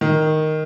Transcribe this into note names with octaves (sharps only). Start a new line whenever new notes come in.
D#3